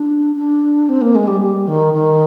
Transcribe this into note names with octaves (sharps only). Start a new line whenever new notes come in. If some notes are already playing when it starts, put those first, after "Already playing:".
Already playing: D4
D4
C4
A#3
G#3
G3
G3
D#3
D#3